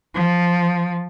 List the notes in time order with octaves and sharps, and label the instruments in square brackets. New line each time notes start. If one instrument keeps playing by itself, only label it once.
[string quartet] F3